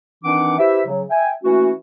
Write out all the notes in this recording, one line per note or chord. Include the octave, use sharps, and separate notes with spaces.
D#3 E3 C4 D4 F#5 D6
E4 G4 B4 C5 E5
C#3 F#3
E5 G5 G#5
E3 A3 A#3 C#4 F#4